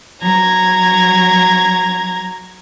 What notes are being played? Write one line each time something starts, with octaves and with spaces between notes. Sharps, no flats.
F#3 A#5 G#6